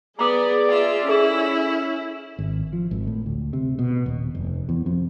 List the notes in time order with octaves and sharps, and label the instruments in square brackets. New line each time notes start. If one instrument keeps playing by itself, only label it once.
[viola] B3 [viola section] G#4 D5 [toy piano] A#5 D6 D#6
[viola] F4 E5 [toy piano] G5
[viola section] C#4 [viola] E4 [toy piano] G#4 A4
[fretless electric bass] G#1
F3
G#1
A2
D2
C3
B2
D#1
F1
E2
F2